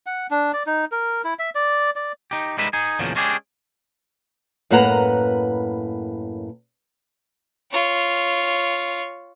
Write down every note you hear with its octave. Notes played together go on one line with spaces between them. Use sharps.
F#5
D4
D5
D#4
A#4
E4
E5
D5
D5
D#4 G4
G3 G#3 D#4 B4 E5
D#4 G#4
E2 A#2 C#3 F3 F#3
G#3 C#4 D4 G4 G#4
F#2 A2 A#3 B4 F#5 A#5
F4 C#5